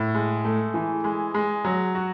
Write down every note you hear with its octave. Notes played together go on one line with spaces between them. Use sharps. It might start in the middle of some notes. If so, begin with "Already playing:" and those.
Already playing: A2
G#3
A3
E3
G#3
G#3
F#3
F#4